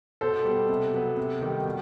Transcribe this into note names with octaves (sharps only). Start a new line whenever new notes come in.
B2 A4 C5
G3 B3
C3
F#3 B3
C3
D#3 G3
B2